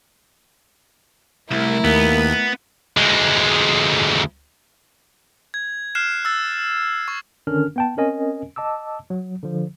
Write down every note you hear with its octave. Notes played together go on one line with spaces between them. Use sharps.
C2 A3 E4 A#4
D#2 A#3 B3
D2 G#3
G#6
F6 F#6 C7 E7
E6 A6
C#6
D3 D#3 C#4 D4 A#4 F6
B3 G5 A5
C4 C#4 A#4 D#5 G#5
D#5 A5 D6 E6
F#3
D3 F3